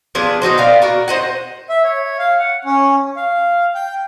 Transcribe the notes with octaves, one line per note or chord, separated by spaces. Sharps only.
F3 B3 D4 G#4
D#3 D#4 F#4 C5
B3 D5 F5
F#4 A#4
C5 D#5 F#5
E5
C#5
F5
F#5
C#4
F5
G5